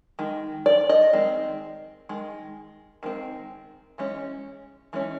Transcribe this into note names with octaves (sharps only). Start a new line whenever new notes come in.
D#3 G#3
D5
D#5
D#3 G#3 C4
D#3 G#3
D#3 G#3 C4
E3 G#3 C#4
E3 G#3 C#4